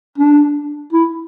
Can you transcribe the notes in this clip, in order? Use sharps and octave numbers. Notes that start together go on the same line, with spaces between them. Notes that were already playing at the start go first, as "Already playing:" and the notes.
D4
E4